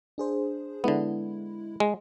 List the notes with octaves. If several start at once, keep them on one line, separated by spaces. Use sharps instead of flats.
D4 G#4 C5
D3 G#3 B3 E4
G#3